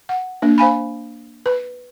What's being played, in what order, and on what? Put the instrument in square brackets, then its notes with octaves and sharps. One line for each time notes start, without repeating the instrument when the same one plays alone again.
[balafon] F#5
A#3 D4
C5 F5 G#5 B5
B4